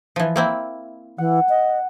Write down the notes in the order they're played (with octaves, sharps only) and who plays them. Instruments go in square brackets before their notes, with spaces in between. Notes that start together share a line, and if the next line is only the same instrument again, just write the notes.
[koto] E3 F3
A#3 C4 E4
[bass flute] E3 [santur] F#5
[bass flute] D#5